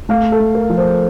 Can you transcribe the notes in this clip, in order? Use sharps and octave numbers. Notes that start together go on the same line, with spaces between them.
A3 F5
A4
A3
A#4
F3
C5